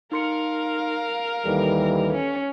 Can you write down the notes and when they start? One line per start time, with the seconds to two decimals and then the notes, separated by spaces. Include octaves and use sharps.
0.12 D#4 A#4 F5 C6 C#7
1.46 D#2 E3 G3 A4
2.13 C#4